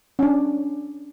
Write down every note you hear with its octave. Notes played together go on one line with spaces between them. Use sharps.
C#4 D4